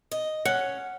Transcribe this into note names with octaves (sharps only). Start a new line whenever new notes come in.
D#5
C#4 F#5